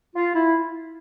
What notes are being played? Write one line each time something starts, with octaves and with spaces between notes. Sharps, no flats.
F4
E4